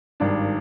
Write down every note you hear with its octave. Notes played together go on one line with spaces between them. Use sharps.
G#1 G2 D#3 D4